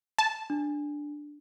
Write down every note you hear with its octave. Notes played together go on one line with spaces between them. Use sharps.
A5
D4